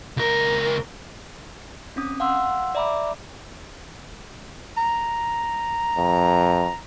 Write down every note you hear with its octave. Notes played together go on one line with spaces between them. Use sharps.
C#2 A#4
C4 C#4 D#6
F5 F#5 C6 E6
D5 E5 A#5 B5 D6
A#5
F2